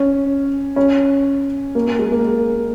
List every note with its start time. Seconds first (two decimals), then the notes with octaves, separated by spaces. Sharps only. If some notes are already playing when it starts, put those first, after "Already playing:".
Already playing: C#4
0.76 C#4
1.75 A#3
1.87 A#3
1.99 G#3
2.12 A#3
2.25 G#3